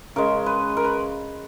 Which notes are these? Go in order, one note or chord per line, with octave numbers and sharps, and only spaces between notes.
C#3 G#3 A#4
B4
A#4
B4